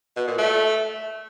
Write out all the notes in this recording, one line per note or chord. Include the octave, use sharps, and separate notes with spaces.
B2
A#2
A3